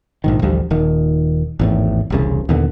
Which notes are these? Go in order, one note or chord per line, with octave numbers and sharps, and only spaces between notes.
A#1 G#2 D#3
A1 D2 F3 G3
D#1 D#3
G#1 E2 A2
E1 C2 C#3
D#2 A#2 D3 B3